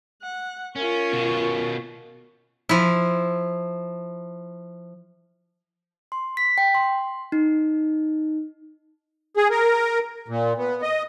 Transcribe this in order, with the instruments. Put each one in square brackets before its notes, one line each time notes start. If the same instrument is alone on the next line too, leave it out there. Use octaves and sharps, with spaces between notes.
[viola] F#5
[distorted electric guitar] C#4 [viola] F4 C#6 [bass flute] A#4
[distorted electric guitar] B2 C#4
[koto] F3 E4
[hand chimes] C6
B6
G5
C6
D#4
[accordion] G#4
A#4
A#2
B3
D#5